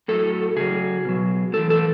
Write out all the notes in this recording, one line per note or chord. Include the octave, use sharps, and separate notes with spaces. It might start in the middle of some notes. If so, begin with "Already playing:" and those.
A2 F#3 A4
C#3 F#3 G#4
B2 F#3
A2 E3 A4
A4